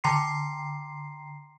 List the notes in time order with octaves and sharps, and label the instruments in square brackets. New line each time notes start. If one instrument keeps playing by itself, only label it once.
[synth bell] D3 G5 A#5 C6 C7